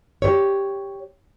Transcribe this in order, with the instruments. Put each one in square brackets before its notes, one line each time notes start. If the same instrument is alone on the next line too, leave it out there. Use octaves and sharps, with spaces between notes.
[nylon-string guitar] G4 C#5